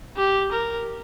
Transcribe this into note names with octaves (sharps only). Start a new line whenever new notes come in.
G4
A#4